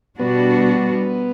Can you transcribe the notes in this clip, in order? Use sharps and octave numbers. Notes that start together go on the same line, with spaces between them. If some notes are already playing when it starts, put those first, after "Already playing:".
B2 G3 B3 D4 F#4